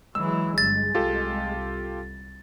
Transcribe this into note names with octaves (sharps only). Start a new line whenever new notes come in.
E3 F#3 G#3 E6
G1 A6
C2 F4 G4 A4